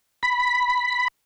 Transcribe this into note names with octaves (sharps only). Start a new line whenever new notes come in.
B5